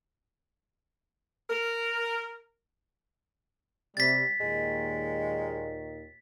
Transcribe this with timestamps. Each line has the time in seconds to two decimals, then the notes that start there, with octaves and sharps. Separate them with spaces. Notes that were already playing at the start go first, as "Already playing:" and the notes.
1.50 A#4
3.97 C3 G3 A6 B6
4.40 D#2 A#2 D#3 G#3